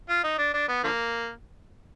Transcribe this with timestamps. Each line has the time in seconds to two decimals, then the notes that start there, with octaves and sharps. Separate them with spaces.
0.09 F4
0.24 D#4
0.38 D4
0.54 D4
0.68 B3
0.84 D3 F3 A#3